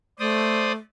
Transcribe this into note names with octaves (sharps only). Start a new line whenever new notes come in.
A3 C5 D5 D#6